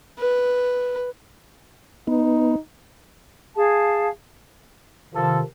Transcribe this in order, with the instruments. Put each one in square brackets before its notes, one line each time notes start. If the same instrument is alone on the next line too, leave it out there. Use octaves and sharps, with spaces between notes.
[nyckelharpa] B4
[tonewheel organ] B3 [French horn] D#4
[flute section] G#4 F5 A5
[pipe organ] C3 D#3 [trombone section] F3 A4